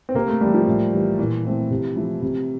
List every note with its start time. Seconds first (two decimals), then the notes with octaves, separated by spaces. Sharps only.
0.09 C4
0.15 C3 A#3
0.28 A3
0.41 G3 A3
0.45 E3
0.54 F3
0.67 A2
0.93 E3 G3
1.19 A#2 E3
1.44 A3 C4 E4
1.70 C3
1.96 F3 A3 E4
2.22 C3